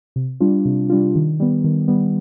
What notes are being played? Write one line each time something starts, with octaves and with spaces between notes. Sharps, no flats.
C3
G3 D4 F4
C3
G3 D4 F4
D#3
G3 B3
D#3
G3 B3